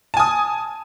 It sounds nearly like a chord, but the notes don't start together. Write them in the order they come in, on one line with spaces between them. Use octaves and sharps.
A5 G#5 D#6